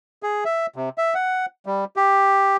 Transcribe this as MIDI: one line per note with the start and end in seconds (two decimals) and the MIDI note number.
0.23 0.44 68
0.45 0.66 76
0.76 0.89 48
0.98 1.14 76
1.14 1.46 78
1.66 1.85 55
1.96 2.57 67